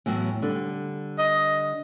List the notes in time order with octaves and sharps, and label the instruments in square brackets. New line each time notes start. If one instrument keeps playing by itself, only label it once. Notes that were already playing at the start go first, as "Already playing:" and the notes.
[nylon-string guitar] E2 A2 F#3
D3 G3
[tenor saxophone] D#5